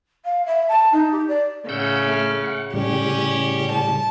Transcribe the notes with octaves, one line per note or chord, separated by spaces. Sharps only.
F5
E5
A5
D#4
G4
D5
A2 C#3 F#5 E6 G6
A3 F6
F#5
A2 C#3 G3 C#4 G4
A5